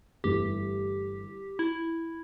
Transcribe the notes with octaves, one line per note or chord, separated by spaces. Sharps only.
G1 G2 E3 A3 E4 G4
E4